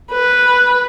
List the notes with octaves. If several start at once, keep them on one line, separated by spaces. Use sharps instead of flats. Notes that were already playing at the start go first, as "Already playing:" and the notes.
B4